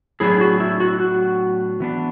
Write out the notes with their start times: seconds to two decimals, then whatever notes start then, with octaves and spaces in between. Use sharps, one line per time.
0.20 A2 F#3 B3 D4 E4 G#4
0.41 F#4
0.60 E4
0.80 F#4
1.00 F#4
1.80 E3 B3 D4